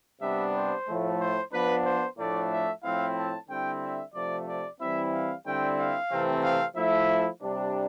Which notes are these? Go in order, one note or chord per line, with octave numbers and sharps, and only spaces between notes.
C3 G3 B3 D4 E5
C5
A2 F3 A3
C5
F3 B3 D4 B4
C5
A2 F3 A3 D4 D5
E5
A2 F3 C4 E4 F5
A5
D3 G3 C4 E4 G5
E5
C3 F3 A3 D5
D5
E3 G3 C4 E4 E5
F5
D3 G3 C4 E4 G5
F5
C3 E3 A3 C4
F5
F3 A3 E4 E5
C3 G3 D4